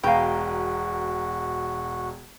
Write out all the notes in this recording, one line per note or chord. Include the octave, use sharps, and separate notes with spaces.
E1 B2 F#4 F5 G5 A#5 B5